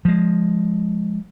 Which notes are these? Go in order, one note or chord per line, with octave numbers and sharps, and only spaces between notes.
F3 G#3